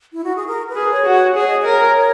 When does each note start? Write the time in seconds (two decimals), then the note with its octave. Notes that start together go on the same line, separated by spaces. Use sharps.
0.13 E4
0.24 F#4
0.36 G#4
0.47 A#4
0.69 B4
0.76 G#4
0.91 C#5
1.06 F#4
1.13 C#5
1.35 G#4 C#5
1.47 D#5
1.59 C#5
1.65 A#4